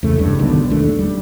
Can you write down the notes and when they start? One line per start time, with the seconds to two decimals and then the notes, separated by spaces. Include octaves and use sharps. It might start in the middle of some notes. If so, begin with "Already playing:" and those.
0.03 E2 C#3 A3
0.18 F#1 C#2 G2
0.39 B1 B2 D3 D#3
0.70 E1 D#2 A3 D4
0.99 G3